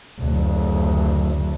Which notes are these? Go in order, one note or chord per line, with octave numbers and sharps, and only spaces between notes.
F#1 D2